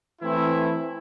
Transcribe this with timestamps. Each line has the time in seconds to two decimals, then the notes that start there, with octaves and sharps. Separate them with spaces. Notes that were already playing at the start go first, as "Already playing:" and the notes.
0.21 E3 A3 C4 E4